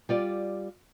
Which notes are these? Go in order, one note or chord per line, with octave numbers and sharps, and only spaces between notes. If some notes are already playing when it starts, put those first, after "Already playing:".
G3 F4 D5